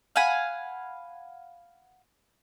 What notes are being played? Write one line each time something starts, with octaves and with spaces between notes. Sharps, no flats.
F5 F#5 G#5 B5